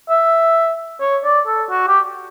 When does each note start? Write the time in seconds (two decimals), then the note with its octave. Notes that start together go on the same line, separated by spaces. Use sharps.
0.10 E5
1.01 C#5
1.24 D5
1.47 A4
1.71 F#4
1.88 G4